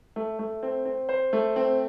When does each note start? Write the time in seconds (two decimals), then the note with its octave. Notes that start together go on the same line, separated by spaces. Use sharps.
0.16 A3
0.39 A3
0.63 C4
0.85 C4
1.09 C5
1.33 A3
1.56 C4